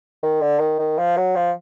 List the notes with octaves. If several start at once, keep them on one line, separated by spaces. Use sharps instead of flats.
D#3
D3
D#3
D#3
F3
F#3
F3